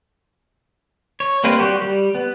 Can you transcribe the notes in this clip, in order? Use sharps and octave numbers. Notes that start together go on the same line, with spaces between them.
C#5
G3 A#3 C4 B4
G3 F#4 G4
G3
B3